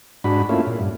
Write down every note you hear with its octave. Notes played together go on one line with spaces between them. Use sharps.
G#2 D4 F#4 B5
A3 A#3 C#4 E4 F4
A#2
G2